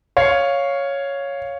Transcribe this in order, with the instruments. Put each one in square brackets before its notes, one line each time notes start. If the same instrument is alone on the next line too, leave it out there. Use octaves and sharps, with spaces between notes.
[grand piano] C#5 F5